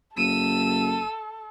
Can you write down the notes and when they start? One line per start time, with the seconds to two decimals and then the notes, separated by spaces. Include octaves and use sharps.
0.17 F#1 A4 E6 D#7